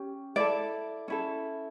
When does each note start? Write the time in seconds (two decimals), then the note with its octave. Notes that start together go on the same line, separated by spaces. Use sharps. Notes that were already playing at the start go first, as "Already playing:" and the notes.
Already playing: C#4 G4
0.36 E4 A4 D5
1.08 C#4 E4 A4